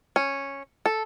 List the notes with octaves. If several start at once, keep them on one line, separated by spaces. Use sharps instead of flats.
C#4
A4